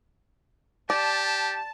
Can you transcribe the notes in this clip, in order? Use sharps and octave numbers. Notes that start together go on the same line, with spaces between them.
G4 D5 A5